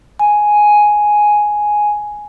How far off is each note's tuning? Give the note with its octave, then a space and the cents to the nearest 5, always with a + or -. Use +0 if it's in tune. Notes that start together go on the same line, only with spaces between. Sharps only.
G#5 +5